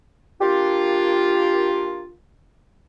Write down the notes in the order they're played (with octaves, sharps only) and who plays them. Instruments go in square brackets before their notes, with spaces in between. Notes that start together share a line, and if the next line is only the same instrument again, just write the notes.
[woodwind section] A#3 D4 F4 [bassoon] G4